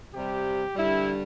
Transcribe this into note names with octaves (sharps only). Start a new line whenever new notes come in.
C3 G3 G4
G2 D3 G3 E4